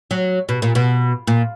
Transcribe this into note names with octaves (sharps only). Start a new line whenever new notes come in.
F#3
B2
A#2
B2
A#2